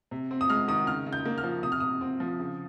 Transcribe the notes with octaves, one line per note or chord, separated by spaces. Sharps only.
C3
C4
D#6
G#3 F6
D#3 D#6
C#3 F6
C#3
G6
A#3
F6
F3
C3 D#6
F6
C3 D#6
C4
F3
C#3